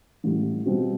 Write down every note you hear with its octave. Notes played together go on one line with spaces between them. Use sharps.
A1 A2 G3
B2 G3 C4 F4